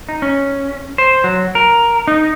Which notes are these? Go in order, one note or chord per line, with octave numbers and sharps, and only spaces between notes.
D#4
C#4
C5
F#3
A#4
D#4